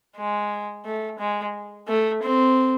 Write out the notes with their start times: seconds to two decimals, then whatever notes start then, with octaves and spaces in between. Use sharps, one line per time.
0.17 G#3
0.85 A3
1.19 G#3
1.88 A3
2.22 C4